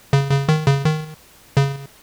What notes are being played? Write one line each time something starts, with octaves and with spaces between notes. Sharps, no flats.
C#3
C#3
D#3
C#3
D#3
C#3